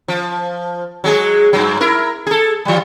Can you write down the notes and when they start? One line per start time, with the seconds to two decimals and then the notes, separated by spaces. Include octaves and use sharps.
0.08 F3
1.04 F#3 G#3 G#4
1.53 G2 F#3
1.81 E4 A#4
2.27 G#4 A4
2.65 E3 G3